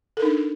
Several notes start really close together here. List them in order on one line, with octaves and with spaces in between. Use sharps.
A4 A#4 D#4 D4